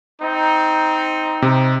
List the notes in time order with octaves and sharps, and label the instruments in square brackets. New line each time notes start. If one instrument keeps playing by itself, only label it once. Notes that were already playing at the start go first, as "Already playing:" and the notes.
[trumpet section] C4 D#4
[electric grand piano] C3